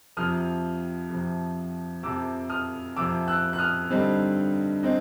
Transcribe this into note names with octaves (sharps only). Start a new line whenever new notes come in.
F2 C3 F3 D#6 F6
F2 C3 F3
F2 C3 F3 D6 E6
D#6 F6
F2 C3 F3 D6 E6
E6 F#6
F#6
D#6 F6
G2 D3 G3 C4 D#4
C4 D#4